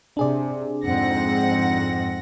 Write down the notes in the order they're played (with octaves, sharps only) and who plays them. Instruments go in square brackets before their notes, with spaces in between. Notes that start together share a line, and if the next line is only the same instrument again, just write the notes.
[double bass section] C3 [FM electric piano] D4 G#4 D5
[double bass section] F2 G#2 C4 [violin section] F#5 A#6